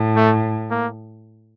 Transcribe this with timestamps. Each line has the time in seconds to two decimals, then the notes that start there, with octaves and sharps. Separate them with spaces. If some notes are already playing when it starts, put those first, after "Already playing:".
Already playing: A2
0.16 A3
0.71 A#3